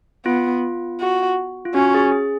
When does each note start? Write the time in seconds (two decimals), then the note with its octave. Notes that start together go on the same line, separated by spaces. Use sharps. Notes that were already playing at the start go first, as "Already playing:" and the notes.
0.26 B3 F4
1.01 F#4
1.65 F4
1.75 C#4 F#4
1.94 G#4
2.12 G#4